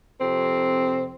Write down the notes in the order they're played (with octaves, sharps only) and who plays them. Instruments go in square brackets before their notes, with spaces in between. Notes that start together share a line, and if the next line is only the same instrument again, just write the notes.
[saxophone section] F2 C3 C4